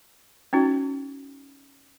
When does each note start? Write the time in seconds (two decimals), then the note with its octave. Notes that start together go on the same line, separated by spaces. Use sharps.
0.53 C#4 D#4 F#4